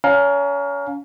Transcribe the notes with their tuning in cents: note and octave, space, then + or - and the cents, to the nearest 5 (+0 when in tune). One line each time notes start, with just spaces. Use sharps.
C#4 +30 F5 +20 A#5 +0